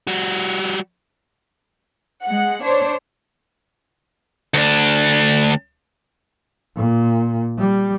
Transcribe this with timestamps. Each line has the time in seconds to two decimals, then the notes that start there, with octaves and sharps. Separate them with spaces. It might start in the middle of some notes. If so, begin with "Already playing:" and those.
0.07 G3 F#4
2.24 G#3 F#5
2.62 D4 C5 C#5
4.54 D2 D4
6.75 A#2
7.58 G3